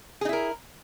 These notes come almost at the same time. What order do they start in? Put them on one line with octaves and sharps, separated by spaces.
G#4 D#4 E4 A#4